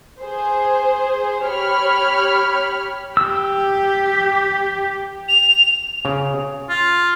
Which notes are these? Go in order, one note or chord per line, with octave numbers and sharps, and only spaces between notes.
G#4 C5
G4 C#5 B5 F6
G4 E6
F7
C#3
F4